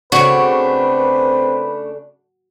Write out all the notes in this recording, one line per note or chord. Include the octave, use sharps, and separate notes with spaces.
C#3 A3 C4 D4 F#4 B4